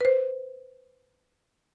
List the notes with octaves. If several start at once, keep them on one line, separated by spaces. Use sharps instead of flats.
B4 C5